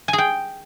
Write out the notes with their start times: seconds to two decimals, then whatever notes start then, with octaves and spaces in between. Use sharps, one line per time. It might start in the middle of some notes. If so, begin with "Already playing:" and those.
0.08 G#5
0.13 G#4
0.18 G5